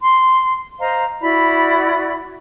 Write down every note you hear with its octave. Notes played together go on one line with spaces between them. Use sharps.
C6
C5 D#5 F5 A#5
E4 F#4 D5 B5